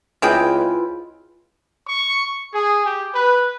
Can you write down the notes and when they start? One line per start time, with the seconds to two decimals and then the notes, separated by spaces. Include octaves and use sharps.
0.22 C#2 C3 E4 F4 G#4 B4 G5
1.86 C#6
2.52 G#4
2.85 G4
3.14 B4